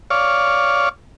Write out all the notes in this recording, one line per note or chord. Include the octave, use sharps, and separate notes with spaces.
C#5 D5 F5